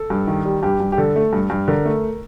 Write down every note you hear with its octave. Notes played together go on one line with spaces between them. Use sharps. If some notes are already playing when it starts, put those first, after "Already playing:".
Already playing: A4
G2
D#3
G3
G2 G4
G2
G4
D3 A4
A3
G2
G2
D3 A#4
A3